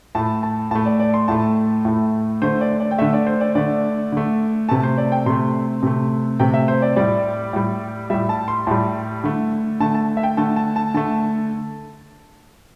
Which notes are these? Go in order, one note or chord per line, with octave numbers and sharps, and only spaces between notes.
A2 A3 A5
A5
A2 A3 A5
D5
D5
C6
A2 A3 A5
A2 A3
D3 A3 C5
D5
D5
G5
D3 A3 E5
D5
C5
D5
D3 A3 D5
D3 A3
C3 A3 A5
C5
D5
G5
C3 A3 C6
C3 A3
C3 A3 G5
E5
C5
D5
A2 G3 D5
A2 G3
A2 G3 E5
A5
C6
A2 G3 A5
D3 A3
D3 A3 A5
A5
E5
G5
D3 A3 A5
A5
A5
D3 A3 A5